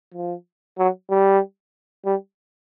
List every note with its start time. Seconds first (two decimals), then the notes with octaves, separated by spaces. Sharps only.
0.14 F3
0.78 F#3
1.10 G3
2.06 G3